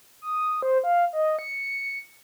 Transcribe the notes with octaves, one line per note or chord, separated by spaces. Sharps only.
D#6
C5
F5
D#5
C#7